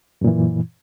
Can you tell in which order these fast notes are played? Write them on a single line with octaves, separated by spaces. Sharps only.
F#2 A#2 E3